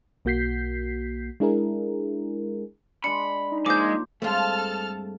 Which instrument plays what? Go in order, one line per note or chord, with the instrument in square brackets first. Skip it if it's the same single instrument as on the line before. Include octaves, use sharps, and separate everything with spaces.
[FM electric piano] B1 A#3 F#4 G6 B6 C7
G#3 D4 E4 G#4 A#4
[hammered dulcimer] G#3 D4 [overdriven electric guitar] B5 [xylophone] C#7
[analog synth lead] D#4
[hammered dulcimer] F3 A#3 C5 [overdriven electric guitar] G#3 G#4 [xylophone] D6 G6
[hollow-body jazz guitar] G2 G#3 A3 [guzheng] C4 F4 [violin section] A4 A5 F6